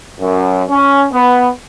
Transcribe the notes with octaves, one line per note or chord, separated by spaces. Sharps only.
F#2
C#4
B3